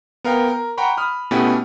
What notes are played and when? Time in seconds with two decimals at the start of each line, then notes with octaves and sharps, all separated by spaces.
0.24 B3 A#4 F5 G5
0.48 A#4
0.77 F#5 G5 A#5 B5 C#6
0.97 B5 D#6 F6
1.31 B2 A3 B3 C#4 E4 G4